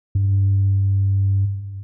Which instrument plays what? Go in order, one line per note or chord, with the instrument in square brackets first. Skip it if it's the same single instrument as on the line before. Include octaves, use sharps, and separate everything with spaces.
[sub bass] G2